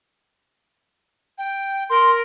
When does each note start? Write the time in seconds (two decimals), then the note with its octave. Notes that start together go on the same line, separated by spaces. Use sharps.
1.38 G5
1.90 A#4 C6